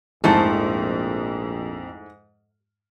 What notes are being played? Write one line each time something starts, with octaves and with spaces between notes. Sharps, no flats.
A#1 F2 G#2 A3 E4 C5